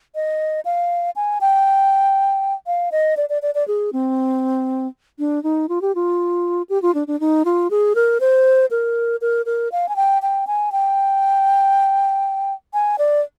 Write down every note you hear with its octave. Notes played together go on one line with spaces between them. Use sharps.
D#5
F5
G#5
G5
F5
D#5
D5
D5
D5
D5
G#4
C4
D4
D#4
F4
G4
F4
G4
F4
D4
D4
D#4
F4
G#4
A#4
C5
A#4
A#4
A#4
F5
G#5
G5
G5
G#5
G5
G#5
D5